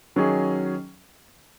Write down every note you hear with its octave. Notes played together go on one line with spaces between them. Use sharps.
D#3 F#3 C#4 G#4